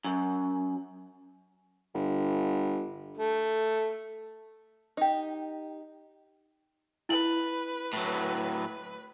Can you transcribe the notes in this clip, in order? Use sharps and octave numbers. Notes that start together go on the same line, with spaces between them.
F#2
G1
A3
D#4 G4
E4 B4 F#7
A2 F#3